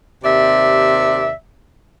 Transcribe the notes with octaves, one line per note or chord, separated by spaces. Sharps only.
D#2 C3 D5 E5